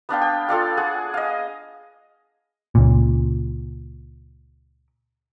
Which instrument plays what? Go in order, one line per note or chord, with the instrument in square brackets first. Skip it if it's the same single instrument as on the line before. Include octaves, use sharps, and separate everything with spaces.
[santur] B3 D4 F5 G5
G5
F4 A4 D5 F5
G#4 F#5
D#5 F5
[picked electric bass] C#2 A#2